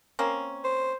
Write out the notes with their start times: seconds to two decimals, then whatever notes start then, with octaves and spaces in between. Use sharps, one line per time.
0.19 A#3 C4 C#4
0.64 C5